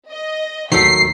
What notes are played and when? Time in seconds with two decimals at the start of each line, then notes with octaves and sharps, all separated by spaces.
0.10 D#5
0.72 D#2 A2 D#3 F#3 A4 B6 C7